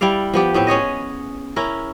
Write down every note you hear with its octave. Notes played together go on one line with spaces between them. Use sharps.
G3 E4 D5 F5
F3 B3 G4
A2 B3 C4
C#4 G#4 C#5 D#5
C#4 E4 A#4